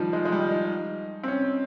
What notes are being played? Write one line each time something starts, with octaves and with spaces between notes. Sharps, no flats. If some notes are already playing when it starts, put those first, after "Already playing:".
Already playing: D#3 F3 G3
G#3
G#3
G3
D#4
C4
C#4